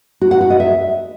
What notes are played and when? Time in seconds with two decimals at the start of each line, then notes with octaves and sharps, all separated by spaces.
0.21 F#4
0.31 F#5
0.41 F#4
0.50 D#5
0.60 E5